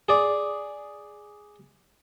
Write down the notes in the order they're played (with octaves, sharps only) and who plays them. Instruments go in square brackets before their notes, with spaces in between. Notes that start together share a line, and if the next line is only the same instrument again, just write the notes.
[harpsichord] G#4 D5